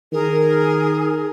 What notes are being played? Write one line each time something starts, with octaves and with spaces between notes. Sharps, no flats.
D#3 G#4 A#4